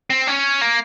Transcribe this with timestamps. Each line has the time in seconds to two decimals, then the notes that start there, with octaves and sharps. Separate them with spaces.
0.10 C4
0.27 C#4
0.61 A#3